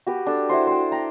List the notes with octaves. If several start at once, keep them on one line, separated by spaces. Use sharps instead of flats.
F#4 G4 B4
D4 A4
E4 F#4 C5
C5 G5
G5 A#5